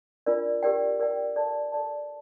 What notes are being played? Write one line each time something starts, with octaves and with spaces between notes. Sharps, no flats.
D4 F4 A#4 D5
G4 A#4 D5 G5
G4 A#4 D5 G5
A4 D5 A5
A4 D5 A5